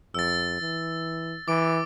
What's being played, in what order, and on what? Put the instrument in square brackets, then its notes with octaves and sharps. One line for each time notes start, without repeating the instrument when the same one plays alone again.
[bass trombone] F2 [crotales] E6 A6
[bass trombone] E3
[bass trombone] E3 [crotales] D6 D7